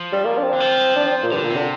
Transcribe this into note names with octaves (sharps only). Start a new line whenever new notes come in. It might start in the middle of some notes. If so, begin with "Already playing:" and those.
Already playing: F3
G3
A#3
D4
C4
D3
F3
D4
C4
A#2
G2 D3
A#2
C3
D3